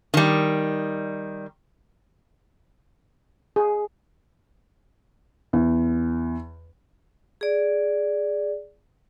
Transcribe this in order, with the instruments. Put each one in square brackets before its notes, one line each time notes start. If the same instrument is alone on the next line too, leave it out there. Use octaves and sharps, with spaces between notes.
[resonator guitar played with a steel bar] D#3 G3
[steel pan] G#4
[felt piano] E2
[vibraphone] G#4 D5